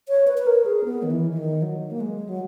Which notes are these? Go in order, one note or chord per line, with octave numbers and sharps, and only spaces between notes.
C#5
B4
B4
A#4
G#4
B3
D#3
E3
E3
D#3
F#3
A#3
G#3
F#3